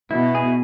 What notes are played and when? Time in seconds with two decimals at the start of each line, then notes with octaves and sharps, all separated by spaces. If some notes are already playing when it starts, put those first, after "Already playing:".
0.11 B2 E4
0.35 G#4